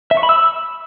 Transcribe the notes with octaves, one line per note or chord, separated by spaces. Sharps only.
E5
C#6
B5
E6